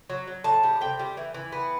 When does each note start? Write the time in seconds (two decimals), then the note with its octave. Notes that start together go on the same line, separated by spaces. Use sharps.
0.10 F#3
0.27 F#3
0.44 A2 A5
0.63 G3
0.81 C3 G5
0.99 G3
1.17 E3
1.34 E3
1.52 B3